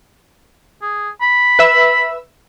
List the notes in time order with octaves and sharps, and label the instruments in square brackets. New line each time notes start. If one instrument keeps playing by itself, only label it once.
[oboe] G#4
B5
[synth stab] B4 E5 E6